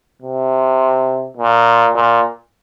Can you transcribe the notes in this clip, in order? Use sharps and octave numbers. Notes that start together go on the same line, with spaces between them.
C3
A#2
A#2